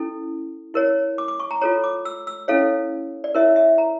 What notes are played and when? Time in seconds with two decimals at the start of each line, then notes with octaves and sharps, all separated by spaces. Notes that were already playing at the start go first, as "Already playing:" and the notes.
Already playing: C#4 E4 A4
0.74 E4 A#4 C#5
1.18 D6
1.28 D6
1.40 C#6
1.51 A#5
1.61 F4 A4 C#5 A#5
1.84 D6
2.05 E6
2.27 E6
2.48 C#4 E4 A4 C#5 F5
3.24 D5
3.35 E4 A#4 C#5 E5
3.56 E5
3.78 A#5